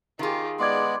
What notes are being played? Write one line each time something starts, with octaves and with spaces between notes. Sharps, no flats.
D#3 F4 G4 G#4
G#3 B3 D5 C6 D6 G#6